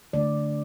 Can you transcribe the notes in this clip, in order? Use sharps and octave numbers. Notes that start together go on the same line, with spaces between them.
D3 A3 D4 D5